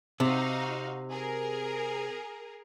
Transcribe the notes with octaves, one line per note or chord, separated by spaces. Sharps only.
C3 D#4 F#4 F5
G#4 A#4